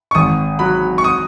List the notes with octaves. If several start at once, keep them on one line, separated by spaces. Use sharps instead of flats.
C#6
G#1 D#6
F#3 B5
C#6
D#6